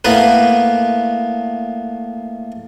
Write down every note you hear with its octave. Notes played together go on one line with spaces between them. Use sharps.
A2 A#3 B3 B4